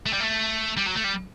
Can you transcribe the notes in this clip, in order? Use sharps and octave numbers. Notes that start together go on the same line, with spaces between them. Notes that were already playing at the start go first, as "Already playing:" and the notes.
A3
G3
A3
G3
F#3
A3
G3